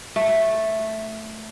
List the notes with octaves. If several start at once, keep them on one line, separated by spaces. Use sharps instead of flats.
A3